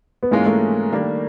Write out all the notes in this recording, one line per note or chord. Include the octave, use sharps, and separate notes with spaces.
B3
G#2 E3 G#3 A#3 C#4 F4
A3
D#3 G3 A#3 D4 G4